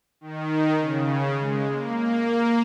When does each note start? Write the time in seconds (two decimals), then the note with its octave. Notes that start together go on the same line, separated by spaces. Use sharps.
0.21 D#3
0.80 C#3
1.40 G#3
1.70 A#3
1.99 A#3